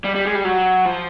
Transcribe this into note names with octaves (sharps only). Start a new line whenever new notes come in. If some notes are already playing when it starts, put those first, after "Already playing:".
G3
G3
G#3
G3
F#3
F3